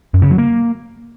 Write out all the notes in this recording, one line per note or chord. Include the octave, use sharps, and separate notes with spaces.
F#2
C#3
F#3
A#3